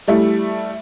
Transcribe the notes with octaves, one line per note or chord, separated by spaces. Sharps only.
G3 A3 E4